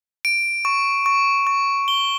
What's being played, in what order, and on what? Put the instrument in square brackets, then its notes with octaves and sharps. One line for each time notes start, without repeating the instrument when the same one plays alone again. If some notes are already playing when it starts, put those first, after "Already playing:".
[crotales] D7
C#6
C#6
C#6
G7